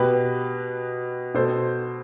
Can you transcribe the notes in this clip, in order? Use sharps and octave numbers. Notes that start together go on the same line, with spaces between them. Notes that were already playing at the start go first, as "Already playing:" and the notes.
Already playing: B2 G4 B4
B2 A4 C5